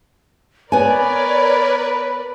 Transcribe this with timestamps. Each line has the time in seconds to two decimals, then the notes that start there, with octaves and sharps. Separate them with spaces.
0.72 B3 A#4 B4 C#5 D5 G#5